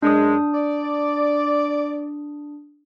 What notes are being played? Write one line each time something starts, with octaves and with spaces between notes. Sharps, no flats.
F#2 G#3 D4 D#6
D5